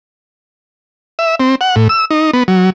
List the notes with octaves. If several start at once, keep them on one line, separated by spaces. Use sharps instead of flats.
E5
C4
F#5
A2
E6
D#4
B3
F#3